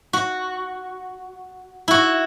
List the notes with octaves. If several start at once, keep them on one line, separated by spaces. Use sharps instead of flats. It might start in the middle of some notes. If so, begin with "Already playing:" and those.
F#4
E4 F#4